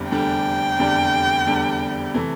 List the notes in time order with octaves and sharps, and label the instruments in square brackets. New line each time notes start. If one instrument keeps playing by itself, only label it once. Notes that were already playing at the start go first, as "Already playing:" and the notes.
Already playing: [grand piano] F1 E2 D3 G3 D4
[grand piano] F1 E2 D3 G3 D4 [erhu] G5
[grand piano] F1 E2 D3 G3 D4
F1 E2 D3 G3 D4
C3 E3 A3